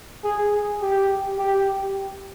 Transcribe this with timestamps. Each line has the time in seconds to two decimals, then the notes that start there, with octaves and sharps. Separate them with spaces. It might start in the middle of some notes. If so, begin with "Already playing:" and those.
0.24 G#4
0.82 G4
1.39 G4